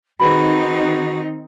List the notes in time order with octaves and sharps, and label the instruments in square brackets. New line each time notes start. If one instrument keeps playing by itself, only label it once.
[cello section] D#3 C4 D#4 [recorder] F#4 [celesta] G#4 B4 B5